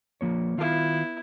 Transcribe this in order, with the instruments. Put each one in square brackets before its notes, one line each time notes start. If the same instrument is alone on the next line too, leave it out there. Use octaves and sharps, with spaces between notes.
[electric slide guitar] F3 A#3 C#5
[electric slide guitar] D#3 F4 F5 [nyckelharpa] B3 E4